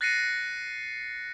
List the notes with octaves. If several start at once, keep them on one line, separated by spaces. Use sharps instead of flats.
F#6 A6 A#6 C7 C#7 D#7